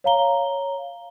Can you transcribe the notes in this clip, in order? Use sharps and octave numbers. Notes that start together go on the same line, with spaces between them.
C#5 F5 A#5 G7